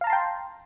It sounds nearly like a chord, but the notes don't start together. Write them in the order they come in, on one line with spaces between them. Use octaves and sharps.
F5 A#5 A5 C6 G5